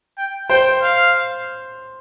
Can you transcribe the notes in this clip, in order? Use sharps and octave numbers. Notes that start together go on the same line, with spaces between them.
G5
C5 G5
F5